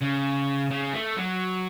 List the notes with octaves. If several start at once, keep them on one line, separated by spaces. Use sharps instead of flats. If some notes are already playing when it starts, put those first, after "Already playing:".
C#3
C#3
A3
F#3